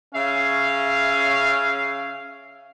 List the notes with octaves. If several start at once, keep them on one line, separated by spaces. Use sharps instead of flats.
C#3 C#4 E5 F5